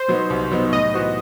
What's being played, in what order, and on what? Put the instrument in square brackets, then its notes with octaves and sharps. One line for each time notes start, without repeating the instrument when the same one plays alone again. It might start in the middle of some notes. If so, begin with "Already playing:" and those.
Already playing: [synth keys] C5
[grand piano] B2 F#3 B3 D#4
C2
B2 F#3 B3 D#4
[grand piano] A2 [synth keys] D#5
[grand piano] E3 B3 F#4 C5